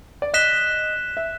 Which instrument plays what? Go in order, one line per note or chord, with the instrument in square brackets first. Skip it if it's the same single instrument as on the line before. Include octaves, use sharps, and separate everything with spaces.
[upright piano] D5
[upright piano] D#5 [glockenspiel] F#6 B6 E7 G7
[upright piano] E5